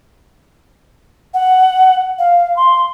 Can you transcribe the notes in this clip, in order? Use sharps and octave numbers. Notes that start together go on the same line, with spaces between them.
F#5
F5
C6